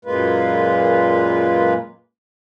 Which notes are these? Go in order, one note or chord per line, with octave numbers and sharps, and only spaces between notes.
F#2 A#2 G#3 A#3 F4 B4